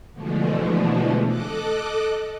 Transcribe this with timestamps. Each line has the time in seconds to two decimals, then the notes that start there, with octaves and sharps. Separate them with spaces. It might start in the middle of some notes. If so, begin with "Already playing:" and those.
0.12 B2 D3 E3 F3 G#3 A3
1.26 A4 D#5 D6 F#6